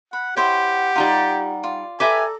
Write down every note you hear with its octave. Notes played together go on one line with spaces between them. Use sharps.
F#5 B5
E4 G4 C5 C#5 F#5 G5
G3 D#4 F4 A#5
F4 D5
G4 A4 B4 D5 E5 G#5 A#5